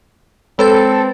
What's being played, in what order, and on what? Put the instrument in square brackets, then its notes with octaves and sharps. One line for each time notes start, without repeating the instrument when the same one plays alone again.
[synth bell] G#3 B4 A6 [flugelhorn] C4 [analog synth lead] A4